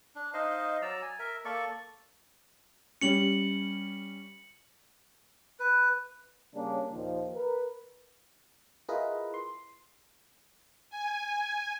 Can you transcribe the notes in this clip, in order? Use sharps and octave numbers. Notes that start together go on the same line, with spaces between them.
D4
D#4 C5 D#5 F5
F#3 D5 A#5 E6
G#5
A#4 E5
A#3 A4 D5 C#6
G3 C#4 C#7 F#7
B4
C#3 G3 A#3 C#4 D4
D#2 A#2 D#3 F3
A#4 B4
E4 F4 G#4 A#4 B4 D#5
C6
G#5